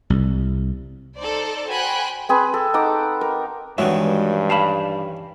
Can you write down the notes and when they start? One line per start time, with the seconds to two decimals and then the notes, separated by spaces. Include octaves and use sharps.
0.10 C2
1.17 D#4 A4 C5 D5
1.70 F#4 C5 G5 G#5 B5 F#6
2.29 C4 G#4 B4 B5
2.54 A4
2.74 D#4 F#5 D6
3.21 A#4
3.78 G2 D#3 E3 G#3 C#4 F#4 E5
4.50 F5 A5 B5